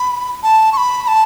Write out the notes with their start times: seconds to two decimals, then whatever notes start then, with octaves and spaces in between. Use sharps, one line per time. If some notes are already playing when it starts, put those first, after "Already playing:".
Already playing: B5
0.43 A5
0.73 C#6
0.77 B5
1.03 B5
1.08 A5